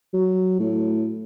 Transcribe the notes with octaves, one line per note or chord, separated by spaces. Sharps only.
F#3
A2